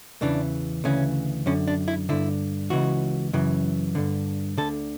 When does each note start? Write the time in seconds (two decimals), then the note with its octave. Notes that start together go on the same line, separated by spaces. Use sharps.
0.21 E2 C#3 E3 D4
0.84 D2 C#3 E3 C#4
1.46 F#2 D3 C#4
1.68 D4
1.88 E4
2.09 G2 D3 E4
2.70 C#2 C#3 E3 F#4
3.33 F#2 C#3 E3
3.95 G2 D3
4.58 D2 D3 A4